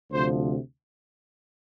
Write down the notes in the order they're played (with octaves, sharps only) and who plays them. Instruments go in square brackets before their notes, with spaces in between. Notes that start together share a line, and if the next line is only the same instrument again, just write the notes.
[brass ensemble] D2 C3 F3 C5